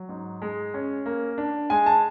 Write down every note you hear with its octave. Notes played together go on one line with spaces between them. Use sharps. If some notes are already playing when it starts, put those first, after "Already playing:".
Already playing: F#3
G#2
G#3
C#4
A#3
D4
G#3 G#5
A5